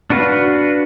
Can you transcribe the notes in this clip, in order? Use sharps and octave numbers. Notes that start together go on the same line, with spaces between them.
D4 F#4 B4 F5